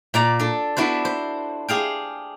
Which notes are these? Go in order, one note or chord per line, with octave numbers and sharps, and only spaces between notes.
A#2 D5 A#5
D4 A4
B3 D4 E4 F#4 C5
C5
G4 G#4 F5 G5